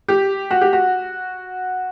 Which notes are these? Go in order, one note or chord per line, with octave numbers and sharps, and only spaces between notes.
G4
F#4
G4
F#4